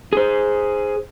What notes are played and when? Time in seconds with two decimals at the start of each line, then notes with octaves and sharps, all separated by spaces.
0.13 G#4 C5